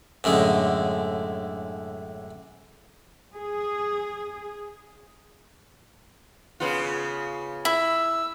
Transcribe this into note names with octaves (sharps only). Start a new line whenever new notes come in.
F#2 A2 D3 G#3
G#4
C#3 B3 F4
E4 E6